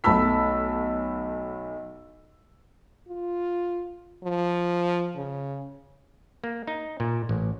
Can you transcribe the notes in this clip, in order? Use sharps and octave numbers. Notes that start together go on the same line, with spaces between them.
B1 A3 A5 B5 E6 B6
F4
F3
C#3
A#3
D#4
A#2
A1